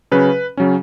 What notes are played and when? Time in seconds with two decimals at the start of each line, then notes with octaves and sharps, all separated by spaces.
0.12 C#3 F#3 C#4 B4
0.57 C#3 F#3 C#4